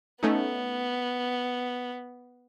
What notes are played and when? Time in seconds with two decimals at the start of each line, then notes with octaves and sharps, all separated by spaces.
0.23 A3 B3 C#4 D#4